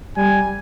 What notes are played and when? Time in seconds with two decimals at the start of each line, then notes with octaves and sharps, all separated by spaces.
0.17 G3 G#5